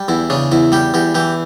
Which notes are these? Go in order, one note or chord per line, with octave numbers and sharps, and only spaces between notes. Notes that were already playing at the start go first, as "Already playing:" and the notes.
Already playing: G3
E2 E4
C#3 D4
E2 E4
G3 G4
E2 G4
E3 G4